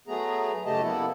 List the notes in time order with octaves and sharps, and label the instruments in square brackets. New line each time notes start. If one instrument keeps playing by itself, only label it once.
[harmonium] F#3 A3 B3 G#4 A#5
F#2 C#3 A3 G4 D#5 A5
A#3 B3 E4 A4